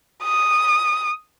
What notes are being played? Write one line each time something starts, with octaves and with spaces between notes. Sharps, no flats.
D#6